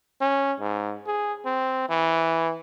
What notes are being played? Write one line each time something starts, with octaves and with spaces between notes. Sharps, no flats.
C#4
G#2
G#4
C4
E3